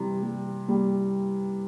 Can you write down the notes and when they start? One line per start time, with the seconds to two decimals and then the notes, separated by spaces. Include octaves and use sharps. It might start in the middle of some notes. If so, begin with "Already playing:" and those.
Already playing: C3 E3 G3
0.22 G3
0.68 G3